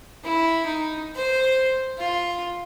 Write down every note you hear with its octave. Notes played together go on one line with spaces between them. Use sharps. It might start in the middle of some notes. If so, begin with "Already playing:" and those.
E4
D#4
C5
F4